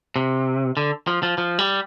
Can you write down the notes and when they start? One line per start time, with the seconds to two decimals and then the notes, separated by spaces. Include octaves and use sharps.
0.16 C3
0.77 D3
1.07 F3
1.23 F3
1.38 F3
1.59 G3